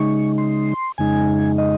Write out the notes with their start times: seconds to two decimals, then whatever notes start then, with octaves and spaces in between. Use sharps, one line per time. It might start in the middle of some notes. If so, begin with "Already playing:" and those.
Already playing: C#3 G#3 D#4 C#6
0.38 C6
0.98 F2 C#3 G#3 D#4 G#5
1.58 D#5